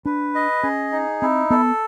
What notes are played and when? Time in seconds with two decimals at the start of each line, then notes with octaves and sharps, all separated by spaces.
0.05 D4 B4
0.35 D#5
0.63 C#4 G#4
0.92 D#4
1.22 C4 E4
1.50 B3 A4